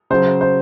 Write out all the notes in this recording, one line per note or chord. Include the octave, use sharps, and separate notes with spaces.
C#3 F#3 C5
C5